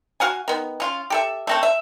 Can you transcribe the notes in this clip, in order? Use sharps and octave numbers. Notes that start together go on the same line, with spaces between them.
F#4 F5 F#5 G#5
D#3 B3
C#4 F4
G4 A4 E5
A3 C4 A4
E5